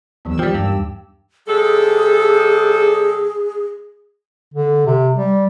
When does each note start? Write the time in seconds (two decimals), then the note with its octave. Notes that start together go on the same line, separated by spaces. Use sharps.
0.25 D#2 E3 F#3 B3 E6
0.39 F3 G3 G4
0.55 G2
1.47 C3 G3 G#4 A4
4.54 D3
4.86 C3
5.15 G3